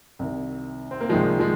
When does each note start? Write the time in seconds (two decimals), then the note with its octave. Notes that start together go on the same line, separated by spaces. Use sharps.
0.19 C2 C3 D#3
0.91 C4
1.01 A#3
1.09 C2 C3 D#3 F3 G#3
1.39 F3 G#3